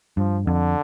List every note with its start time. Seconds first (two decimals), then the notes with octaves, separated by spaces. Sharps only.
0.17 G2 F3
0.47 F2 D3